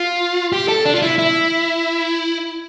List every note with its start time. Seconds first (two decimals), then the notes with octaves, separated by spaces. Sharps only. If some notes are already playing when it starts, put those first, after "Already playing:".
Already playing: F4
0.52 G4
0.68 A4
0.85 D4
0.95 F4
1.02 E4
1.18 E4